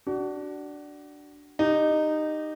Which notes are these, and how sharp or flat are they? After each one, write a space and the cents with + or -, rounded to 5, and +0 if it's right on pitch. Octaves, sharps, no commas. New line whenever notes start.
D4 +0 F#4 +30
D#4 -15 G4 +0